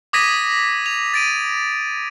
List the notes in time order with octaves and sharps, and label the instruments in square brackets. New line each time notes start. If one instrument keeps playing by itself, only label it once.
[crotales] D6 D#6 G#6 A#6 B6 D#7
F7
A6 D7 D#7